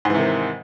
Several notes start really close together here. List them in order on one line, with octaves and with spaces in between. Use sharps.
G#2 E3 C3 D#3